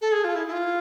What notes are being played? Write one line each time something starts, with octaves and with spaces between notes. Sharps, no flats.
A4
G#4
F4
E4
E4
F4